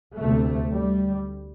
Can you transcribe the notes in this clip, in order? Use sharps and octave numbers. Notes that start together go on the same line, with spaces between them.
D2 C3 A3
G3